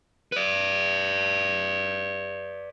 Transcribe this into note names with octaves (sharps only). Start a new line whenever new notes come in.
B4 D5